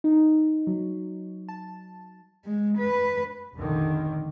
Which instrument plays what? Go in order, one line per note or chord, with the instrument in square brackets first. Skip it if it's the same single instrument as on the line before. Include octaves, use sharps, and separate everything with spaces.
[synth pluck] D#4
F#3
A5
[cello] G#3
B4
[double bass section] F1 A#1 D3 D#3